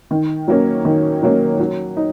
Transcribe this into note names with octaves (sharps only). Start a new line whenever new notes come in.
D#3
F#3 A#3 C#4
D#3
F#3 A#3 C#4
F#3
D#4